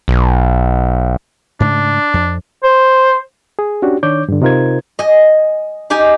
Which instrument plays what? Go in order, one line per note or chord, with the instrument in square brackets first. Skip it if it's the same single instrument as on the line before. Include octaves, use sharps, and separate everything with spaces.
[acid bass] B1
[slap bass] G#2 C#3 A3 [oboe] D4
[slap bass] F2
[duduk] C5
[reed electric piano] G#4
C#4 D4 F#4 G4
D#3 D4 C#5 D6 G6
G2 D3
C3 D#4 F4 A#4 C5 G#6
[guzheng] D#5 G#5
D#4 G4 G#5